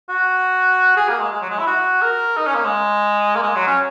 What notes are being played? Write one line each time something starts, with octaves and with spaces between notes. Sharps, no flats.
F#4
G#4
A#3
G#3
G#3
F#3
G#3
E4
F#4
A#4
D#4
C#4
A#3
G#3
A#3
G#3
F#3
C#4